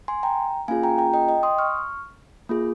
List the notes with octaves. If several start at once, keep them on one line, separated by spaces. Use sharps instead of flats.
G#5 C6
G5 A#5
A#3 C#4 F4 G#4 F5 G#5
G5 A#5
G5 A#5
D#5 G5
D#5 G5
C6 D#6
C#6 F6
A#3 F4 G#4